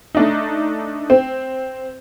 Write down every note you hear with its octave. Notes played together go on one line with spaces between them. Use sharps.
A3 D4 D#4
C4